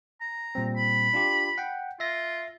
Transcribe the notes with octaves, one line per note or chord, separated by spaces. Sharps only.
A#5
A#2 G3 C4
B5
D4 F4 G4
F#5 G5
F4 E5 A#6